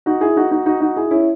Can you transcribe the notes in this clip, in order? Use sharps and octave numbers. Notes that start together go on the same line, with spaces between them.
D#4 F#4
E4 G#4
D#4 F#4
D#4 F#4
D#4 F#4
D#4 F#4
E4 G#4
C#4 E4